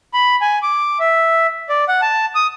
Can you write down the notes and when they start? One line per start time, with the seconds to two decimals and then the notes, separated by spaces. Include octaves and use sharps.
0.14 B5
0.41 G#5
0.62 D6
1.00 E5
1.69 D5
1.88 F#5
2.02 A5
2.35 D#6